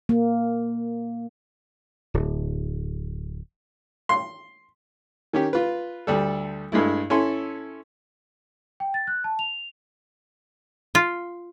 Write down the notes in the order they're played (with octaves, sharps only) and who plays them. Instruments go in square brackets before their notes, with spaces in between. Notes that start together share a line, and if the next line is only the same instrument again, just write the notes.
[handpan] A#3
[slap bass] D1
[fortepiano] C6
D#3 C#4 G4
F4 B4
D2 G3 A4
G2 G#3 A3 E4
C#4 E4 A4 G#5 C6
[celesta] G5
A6
F#6
A5
F7
[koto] F4